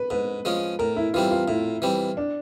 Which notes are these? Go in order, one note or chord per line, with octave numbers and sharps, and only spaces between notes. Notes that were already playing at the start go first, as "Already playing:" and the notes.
Already playing: B4
G#2 B4
F3 G#3 C#4
A2 A#4
E4
E3 G3 C4 F4
F4
A2 E4
E3 G3 C4
D4